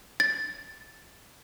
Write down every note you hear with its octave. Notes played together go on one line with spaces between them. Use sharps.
A6